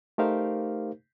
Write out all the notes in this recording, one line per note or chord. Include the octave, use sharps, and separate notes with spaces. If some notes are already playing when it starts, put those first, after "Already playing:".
A3 D#4 G4 A#4 C5 F5